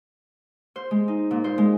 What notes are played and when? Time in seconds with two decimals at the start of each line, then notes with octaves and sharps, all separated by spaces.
0.76 C5
0.91 G#3
1.08 D#4
1.31 A#2
1.44 C5
1.58 G#3